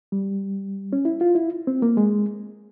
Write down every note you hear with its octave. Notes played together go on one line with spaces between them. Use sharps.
G3
C#4
E4
F4
E4
C4
A#3
G#3